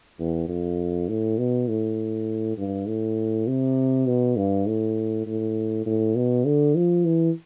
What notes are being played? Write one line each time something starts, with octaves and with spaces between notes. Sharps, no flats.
E2
F2
A2
B2
A2
G2
A2
C3
B2
G2
A2
A2
A2
B2
D3
F3
E3